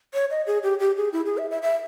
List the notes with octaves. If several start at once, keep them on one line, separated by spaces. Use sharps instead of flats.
C#5
D#5
G#4
G4
G4
G#4
E4
G#4
E5
E5
E5